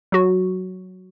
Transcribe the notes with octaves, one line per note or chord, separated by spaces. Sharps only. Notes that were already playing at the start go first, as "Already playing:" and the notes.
F#3 F#4